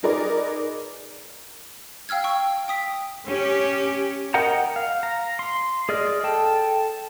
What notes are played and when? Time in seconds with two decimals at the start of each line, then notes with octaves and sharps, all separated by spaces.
0.03 D#4 G#4 A#4 B4 D5
2.09 F5 G5 E6 F6 G#6
2.24 G5 C#6 E6
2.68 G5 D#6 B6
3.28 C#4 G4
4.34 A#4 D#5 F#5 G5 A#5
4.76 F5
5.03 A#5
5.39 C6
5.89 G#4 D5 D#5 F6
6.24 A4 G5 A5